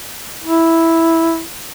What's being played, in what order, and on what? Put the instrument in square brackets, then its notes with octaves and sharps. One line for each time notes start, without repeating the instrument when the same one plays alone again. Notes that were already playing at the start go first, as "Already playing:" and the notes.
[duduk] E4